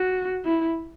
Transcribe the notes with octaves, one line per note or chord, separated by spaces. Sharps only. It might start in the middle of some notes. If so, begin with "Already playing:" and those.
Already playing: F#4
E4